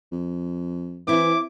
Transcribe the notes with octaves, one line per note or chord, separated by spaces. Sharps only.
F2
E3 C4 E4 D6